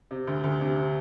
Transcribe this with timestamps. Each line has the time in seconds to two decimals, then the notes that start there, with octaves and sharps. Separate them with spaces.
0.11 C3
0.27 D2
0.44 D2
0.61 C3